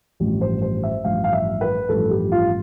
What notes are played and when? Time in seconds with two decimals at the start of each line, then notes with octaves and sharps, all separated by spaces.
0.20 A1 G2 F3
0.41 C5
0.62 C5
0.83 E5
1.04 A1 G2 F3 F5
1.24 F5
1.33 E5
1.61 B4
1.89 A1 G2 F3 A4
2.10 G4
2.32 F4